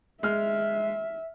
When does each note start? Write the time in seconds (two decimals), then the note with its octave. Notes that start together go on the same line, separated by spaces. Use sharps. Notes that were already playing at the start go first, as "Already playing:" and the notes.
0.23 G#3 E5 F6